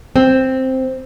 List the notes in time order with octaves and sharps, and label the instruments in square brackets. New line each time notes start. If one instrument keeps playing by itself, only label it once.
[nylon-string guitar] C4